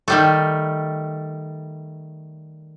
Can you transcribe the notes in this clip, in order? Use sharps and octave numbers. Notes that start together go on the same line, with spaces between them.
D#3 G3 A3